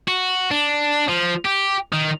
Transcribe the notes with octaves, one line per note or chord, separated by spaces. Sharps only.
F#4
D4
F3
G4
D#3